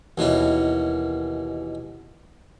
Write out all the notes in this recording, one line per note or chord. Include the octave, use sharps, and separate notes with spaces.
D#2 B2 E3 C#4